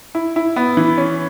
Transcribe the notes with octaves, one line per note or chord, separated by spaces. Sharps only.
E4
E4
B3
E3
C#4